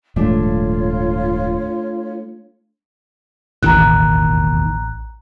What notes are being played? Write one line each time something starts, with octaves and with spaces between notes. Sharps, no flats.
D#1 G#2 F3 A3 D4 F4 C#5
E1 A1 D#2 D#3 A#5 F#6